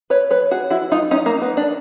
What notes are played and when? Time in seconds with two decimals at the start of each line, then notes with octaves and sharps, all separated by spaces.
0.10 B4 C#5
0.31 B4 C#5
0.51 F#4 G#4
0.70 E4 F#4
0.92 D#4 F4
1.11 C#4 D#4
1.26 A#3
1.42 B3
1.57 D4